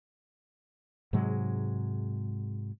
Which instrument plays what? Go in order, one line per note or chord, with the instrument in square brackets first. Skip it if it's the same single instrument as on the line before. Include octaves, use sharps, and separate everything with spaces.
[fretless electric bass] G#2 C3 F#3 G#3